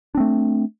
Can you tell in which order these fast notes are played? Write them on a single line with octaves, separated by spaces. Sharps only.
D4 C4 A3